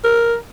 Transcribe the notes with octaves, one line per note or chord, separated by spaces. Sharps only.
A#4